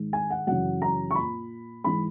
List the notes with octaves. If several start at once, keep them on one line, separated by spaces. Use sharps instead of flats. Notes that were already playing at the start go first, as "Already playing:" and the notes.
Already playing: G#2 D#3
G#5
F#5
F#2 C#3 E3 F#5
A#5
C#6
A#2 B5
G#2 E3 B5